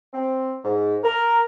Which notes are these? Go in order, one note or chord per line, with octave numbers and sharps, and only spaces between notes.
C4
G#2
A#4